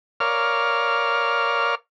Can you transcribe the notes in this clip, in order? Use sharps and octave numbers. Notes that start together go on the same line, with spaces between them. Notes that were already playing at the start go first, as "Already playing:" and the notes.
A#4 C#5 D5 F5 F6